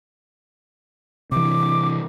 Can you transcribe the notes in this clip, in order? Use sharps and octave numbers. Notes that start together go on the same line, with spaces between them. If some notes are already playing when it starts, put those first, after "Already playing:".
C3 E3 D6